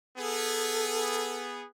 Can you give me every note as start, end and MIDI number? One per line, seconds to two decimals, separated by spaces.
0.18 1.65 59
0.18 1.65 68
0.18 1.48 69